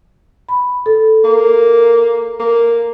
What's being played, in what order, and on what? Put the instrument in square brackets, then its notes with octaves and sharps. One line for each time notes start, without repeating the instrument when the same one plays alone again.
[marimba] B5
A4
[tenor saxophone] A#3
A#3